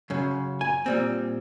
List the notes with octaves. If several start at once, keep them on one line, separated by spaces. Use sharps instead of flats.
F#2 C#3
G#5
A#2 G3 C4